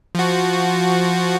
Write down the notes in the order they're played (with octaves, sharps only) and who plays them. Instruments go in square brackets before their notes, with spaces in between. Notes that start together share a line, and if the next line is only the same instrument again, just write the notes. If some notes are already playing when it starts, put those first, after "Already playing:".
[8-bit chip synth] F3 F#4